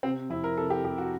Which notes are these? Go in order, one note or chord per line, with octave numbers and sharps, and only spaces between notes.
C3 C4
F2 E4
A#4
C3 A4
G4
F2 G4
F#4